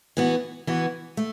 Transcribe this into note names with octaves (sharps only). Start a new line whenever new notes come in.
E3 B3 F#4
E3 B3 F#4
A3